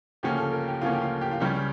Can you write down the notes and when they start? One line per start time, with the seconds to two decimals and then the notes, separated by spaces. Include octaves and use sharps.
0.23 D2 C#3 F3 A#3 C#4 G4
0.37 A4
0.53 A#4
0.68 G4
0.81 D2 C#3 F3 A#3 C#4 F4
0.93 G4
1.02 F4
1.21 G4
1.31 F4
1.40 C#2 C#3 G3 C#4 G4